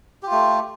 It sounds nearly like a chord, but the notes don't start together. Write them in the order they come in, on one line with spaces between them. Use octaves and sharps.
G4 F4 A3